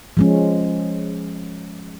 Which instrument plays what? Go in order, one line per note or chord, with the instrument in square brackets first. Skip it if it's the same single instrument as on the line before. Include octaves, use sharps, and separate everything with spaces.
[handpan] F3 G#3 C#4